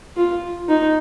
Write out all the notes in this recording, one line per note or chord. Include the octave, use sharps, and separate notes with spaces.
F4
D#4